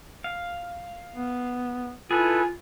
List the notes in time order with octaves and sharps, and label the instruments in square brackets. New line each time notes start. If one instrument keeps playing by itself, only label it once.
[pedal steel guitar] F5
[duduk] B3
[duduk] E4 [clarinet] F4 [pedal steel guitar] G#4 G#5 [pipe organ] A4 B4